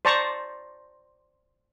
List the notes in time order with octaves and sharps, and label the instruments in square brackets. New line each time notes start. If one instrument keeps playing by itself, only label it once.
[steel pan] C5 D5 A5 A#5 C#6